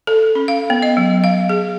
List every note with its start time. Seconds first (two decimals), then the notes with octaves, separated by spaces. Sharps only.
0.07 A4
0.35 C#4
0.48 F5
0.70 B3
0.83 D#5
0.97 F#3
1.24 F5
1.49 G#4